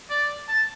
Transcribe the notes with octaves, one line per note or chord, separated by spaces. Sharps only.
D5
A5